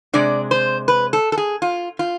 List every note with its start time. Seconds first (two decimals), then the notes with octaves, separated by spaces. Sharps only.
0.13 C3 G#3 D4 D5
0.51 C5
0.88 B4
1.13 A4
1.32 A4
1.37 G#4
1.62 F4
1.99 F4